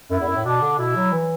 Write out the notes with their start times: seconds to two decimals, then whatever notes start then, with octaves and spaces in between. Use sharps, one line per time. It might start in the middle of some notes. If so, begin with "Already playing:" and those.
0.11 F#2 E4
0.20 E2
0.28 F#2
0.36 A2
0.44 B2 D4
0.61 D3
0.78 B2 E4
0.96 F#3
1.13 E3